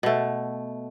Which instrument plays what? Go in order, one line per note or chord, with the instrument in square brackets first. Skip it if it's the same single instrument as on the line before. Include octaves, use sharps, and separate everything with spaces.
[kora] B2 A3